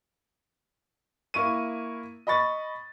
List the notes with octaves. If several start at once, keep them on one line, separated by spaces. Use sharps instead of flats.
A#3 E4 C#6 D#7
D#5 B5 C#6 A6